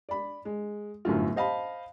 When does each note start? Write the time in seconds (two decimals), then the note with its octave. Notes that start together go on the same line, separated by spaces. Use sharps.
0.09 D5 B5
0.45 G#3
1.05 G1 F#2 A2 F4
1.36 C5 D#5 F5 A5 B5